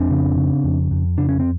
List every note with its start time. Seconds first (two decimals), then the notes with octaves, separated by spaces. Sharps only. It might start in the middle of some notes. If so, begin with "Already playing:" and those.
Already playing: F2 C4 D4
0.10 C#3
0.36 C#3
0.64 F2
0.91 F2
1.18 C#3 D4
1.29 C#4
1.40 C4